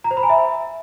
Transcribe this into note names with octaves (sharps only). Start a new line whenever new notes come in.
A#5
C5
B5
G#5
E5